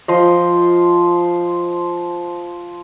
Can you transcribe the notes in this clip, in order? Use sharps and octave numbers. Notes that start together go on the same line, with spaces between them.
F3 C5 D#5